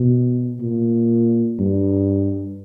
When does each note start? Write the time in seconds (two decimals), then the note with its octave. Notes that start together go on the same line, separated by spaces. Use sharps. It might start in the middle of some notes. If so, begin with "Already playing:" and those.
Already playing: B2
0.61 A#2
1.59 G2